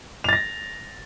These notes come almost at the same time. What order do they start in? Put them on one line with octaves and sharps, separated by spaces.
F7 A6 A#6